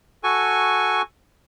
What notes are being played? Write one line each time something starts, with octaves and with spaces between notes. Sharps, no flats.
F#4 A4 G#5 C#6